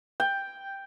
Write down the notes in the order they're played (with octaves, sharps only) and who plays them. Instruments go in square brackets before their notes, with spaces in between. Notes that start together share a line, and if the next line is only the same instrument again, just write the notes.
[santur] G5